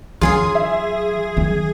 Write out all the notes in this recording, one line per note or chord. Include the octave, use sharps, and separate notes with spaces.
F#2 E3 F#3 F4 G#4 G#5 D#6
E5
D#3 F#3